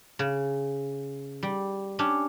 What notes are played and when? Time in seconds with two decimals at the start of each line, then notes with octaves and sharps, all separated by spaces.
0.19 C#3
1.43 G3
1.99 C#4 D4 G4